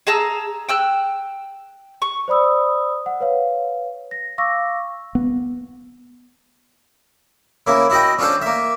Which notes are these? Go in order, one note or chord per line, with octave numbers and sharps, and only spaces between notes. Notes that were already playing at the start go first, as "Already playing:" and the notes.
G#4 A5 A#5 E6
G5 E6 F#6
C#6
C5 D5 B5 D#6 E6
F#5
B4 C#5 F5
A#6
F5 C#6 D6 E6 A#6
B3
C#3 A#3 E4
E4 F#4 D#5 G5
C#4 D4 F4 A4 C5
A#3 E5